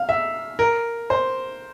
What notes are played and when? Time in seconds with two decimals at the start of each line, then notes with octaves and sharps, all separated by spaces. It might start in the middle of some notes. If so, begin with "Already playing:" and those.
Already playing: F5
0.09 E5
0.59 A#4
1.10 C5